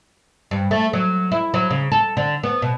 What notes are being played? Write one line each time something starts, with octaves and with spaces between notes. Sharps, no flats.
G2
A3
F#3
E4
F#3
C#3
A4
D3
B3
B2